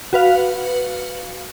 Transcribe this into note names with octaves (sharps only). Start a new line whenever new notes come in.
F#4 B4 F5